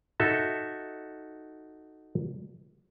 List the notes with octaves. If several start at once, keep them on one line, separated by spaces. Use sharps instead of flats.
D#4 F#4 A4 E5